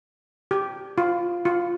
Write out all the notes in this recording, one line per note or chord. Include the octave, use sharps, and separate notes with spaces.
G4
F4
F4